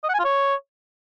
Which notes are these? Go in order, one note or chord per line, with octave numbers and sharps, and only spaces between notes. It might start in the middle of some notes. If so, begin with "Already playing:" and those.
D#5
F#5
G#5
F4
C#5